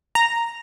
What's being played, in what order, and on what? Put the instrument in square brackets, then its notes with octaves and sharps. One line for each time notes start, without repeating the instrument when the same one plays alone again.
[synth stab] A#5